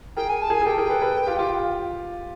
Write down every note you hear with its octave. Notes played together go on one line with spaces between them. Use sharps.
G#4 A#4 G5
G#5
A5
G#4 A#4 G#5
G#4
G4 A4 G5
G#4 A#4
A4 B4
A4 B4
F4 G4
F4 G4